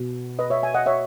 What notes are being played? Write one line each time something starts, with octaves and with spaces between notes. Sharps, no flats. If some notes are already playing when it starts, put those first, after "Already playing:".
Already playing: B2
B4 D#5
C#5 E5
E5 G#5
D#5 F#5
C#5 E5